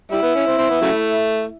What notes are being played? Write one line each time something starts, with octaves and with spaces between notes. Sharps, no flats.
G3 E4
B3
C#4
C4
C4
B3
C#3 F#3 A3